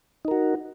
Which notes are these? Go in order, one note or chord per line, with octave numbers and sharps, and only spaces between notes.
D#4 F#4 A#4